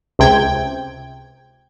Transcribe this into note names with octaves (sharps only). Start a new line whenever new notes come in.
C#2 C3 G5 G#6